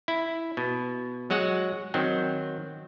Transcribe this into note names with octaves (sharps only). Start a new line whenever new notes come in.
E4
B2
F#3 G#3 F#4 F#5
D#3 F#3 C4